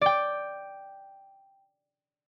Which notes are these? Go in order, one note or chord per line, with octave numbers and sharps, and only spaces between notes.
D5 G5